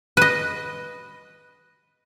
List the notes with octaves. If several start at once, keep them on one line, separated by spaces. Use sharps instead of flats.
B4 D#5